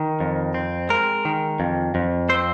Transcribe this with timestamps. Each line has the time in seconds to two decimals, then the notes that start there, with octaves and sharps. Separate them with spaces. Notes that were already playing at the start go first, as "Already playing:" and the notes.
Already playing: D#3
0.20 F2
0.54 C4
0.89 G#3 A#4
1.25 D#3
1.60 F2
1.95 F2
2.29 C4 C5